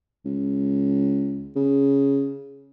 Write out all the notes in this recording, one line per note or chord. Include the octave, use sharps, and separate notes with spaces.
C#2
C#3